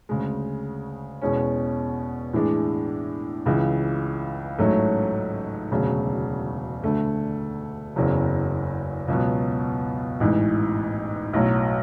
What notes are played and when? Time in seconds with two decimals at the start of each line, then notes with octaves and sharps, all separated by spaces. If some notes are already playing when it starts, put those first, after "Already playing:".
0.09 D2 C#3 G#3
1.22 E2 B2 G#3 C#4
2.33 A2 E3 G#3 D4
3.46 C#2 C#3 E3
4.58 A1 G#2 F#3 A3 C#4
5.71 E1 D2 C#3 F#3
6.83 D2 D3 A3
7.96 F#1 E2 C#3 F#3
9.08 C#2 B2 F#3 B3
10.20 A1 G#2 E3
11.33 B1 A2 F#3